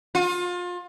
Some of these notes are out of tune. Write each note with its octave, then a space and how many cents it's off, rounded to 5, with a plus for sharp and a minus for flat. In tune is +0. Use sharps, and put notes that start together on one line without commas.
F4 +30